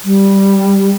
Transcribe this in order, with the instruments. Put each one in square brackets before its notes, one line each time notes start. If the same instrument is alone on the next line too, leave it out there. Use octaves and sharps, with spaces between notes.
[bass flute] G3